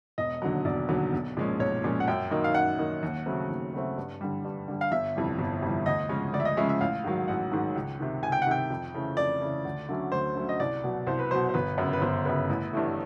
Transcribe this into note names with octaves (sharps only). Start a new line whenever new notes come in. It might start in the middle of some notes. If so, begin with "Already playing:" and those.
E1 D#5
D#2 D3 F#3
E1 D5
D#2 D3 F#3
B1
A#2 F3 G#3 C#4
B1 C#5
A#2 F3 G#3 C#4
F#5
F#2 G5
D#3 F#3 A#3 D#4
F5
F#2 F#5
D#3 F#3 A#3 D#4
D#2
C#3 F#3 A3 C4
D#2
C#3 F#3 A3 C4
G2
D3 G3
G2
D3 G3
F5
G1 E5
F2 C3 E3 G3
G1
F2 C3 E3 G3
D2 D#5
C#3 F3 G#3 C#4
D2 D5
E5
D#5
C#3 F3 G#3 C#4 E5
E5
A1 F5
G#2 D#3 F#3
A1 F#5
G#2 D#3 F#3
C#2
C3 D#3
C#2 G#5
G5
F#5
C3 D#3 G5
F2
C#3 E3 A3
F2 D5
C#3 E3 A3
D2
D3 F#3 A3 C#4
D2 C5
D3 F#3 A3 C#4
D#5
C2 D5
B2 F#3
C2 C5
B4
B2 F#3 C5
C5
G1 B4
F#2 C#3
B4
G1 C5
F#2 C#3 B4
A1
G2 E3 A3